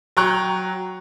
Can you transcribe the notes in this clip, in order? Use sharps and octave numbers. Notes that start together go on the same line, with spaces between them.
F#3 G5 A#5 C#6 F#6